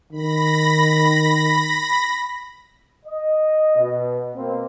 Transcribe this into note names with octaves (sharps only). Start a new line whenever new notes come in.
D#3 B5 A#6
D#5
B2
B2 A#3 C4